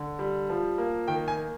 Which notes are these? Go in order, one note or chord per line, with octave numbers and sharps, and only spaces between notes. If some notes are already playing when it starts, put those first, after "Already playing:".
Already playing: D3
G3
F3
A#3
D#3 G5
G#5
A#3